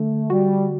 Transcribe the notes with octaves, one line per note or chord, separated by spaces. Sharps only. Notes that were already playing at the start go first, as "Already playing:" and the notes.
Already playing: D3 A3
G3 F#4